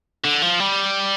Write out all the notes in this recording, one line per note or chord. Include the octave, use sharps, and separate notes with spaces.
D3
F3
G3